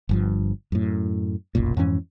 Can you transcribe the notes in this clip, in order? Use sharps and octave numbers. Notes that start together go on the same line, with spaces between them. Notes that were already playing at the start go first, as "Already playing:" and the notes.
G1 G2 F3
F#2 A2
F1 B1 F#2 A#2
F2 G#2 E3 C#4